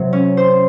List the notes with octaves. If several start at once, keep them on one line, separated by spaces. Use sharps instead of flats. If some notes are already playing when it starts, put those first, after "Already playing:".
Already playing: C3 F#3
C#4
C5